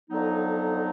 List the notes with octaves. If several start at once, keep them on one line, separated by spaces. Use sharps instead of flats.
F2 D3 F#3 B3 D#4